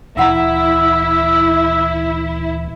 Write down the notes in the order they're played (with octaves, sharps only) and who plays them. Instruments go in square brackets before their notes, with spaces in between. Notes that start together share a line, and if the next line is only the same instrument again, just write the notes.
[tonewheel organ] D2 A#2 E3 [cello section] E4 [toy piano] E5 F#5 A#5 [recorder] E6